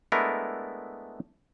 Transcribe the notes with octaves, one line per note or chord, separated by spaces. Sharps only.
G#3 A3 B3 D4 E4 A#4